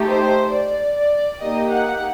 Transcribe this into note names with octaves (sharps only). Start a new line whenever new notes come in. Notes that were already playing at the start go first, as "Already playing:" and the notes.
Already playing: A3 D#4 G4
C5
D5
D5
A#3 D#4 G4 D#5
F#5